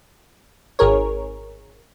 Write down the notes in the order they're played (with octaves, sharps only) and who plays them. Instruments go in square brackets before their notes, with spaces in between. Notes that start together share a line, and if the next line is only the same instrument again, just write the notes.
[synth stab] G#1 G#4 A#4 C#5